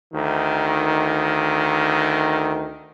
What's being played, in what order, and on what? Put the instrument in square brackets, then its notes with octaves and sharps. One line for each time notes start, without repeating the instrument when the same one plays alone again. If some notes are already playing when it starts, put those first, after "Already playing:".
[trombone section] D2 D#3